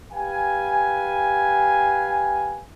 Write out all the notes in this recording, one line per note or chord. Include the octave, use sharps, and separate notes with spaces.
G4 B4 F5 G5 G#5